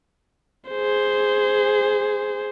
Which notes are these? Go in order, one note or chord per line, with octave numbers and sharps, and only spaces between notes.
G#4 C5